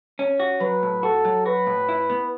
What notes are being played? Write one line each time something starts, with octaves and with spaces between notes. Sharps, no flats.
C#4
F#4
F#3 B4
A2
F#4 A4
F#3
F#4 B4
A2
E4
B3